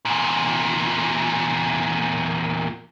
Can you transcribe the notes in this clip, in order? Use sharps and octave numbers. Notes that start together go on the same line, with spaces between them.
E2 A#2